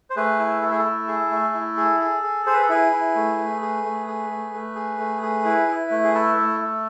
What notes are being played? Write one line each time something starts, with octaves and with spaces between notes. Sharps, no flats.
C5
A3 G#4 B4
E4
A3 A4
G#4
A4
E4
G#4
A3
E4
G#4
G#4
G#4
G#4 C5
B4
A4
E4 G#4 B4
E4
A3
A3
G#4
A3
G#4
A3
A3
G#4
A3
G#4
E4
E4
A3
G#4
E4 A4
A3
A3